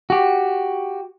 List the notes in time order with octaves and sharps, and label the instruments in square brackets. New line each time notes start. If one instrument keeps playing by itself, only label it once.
[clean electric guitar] F#4 G4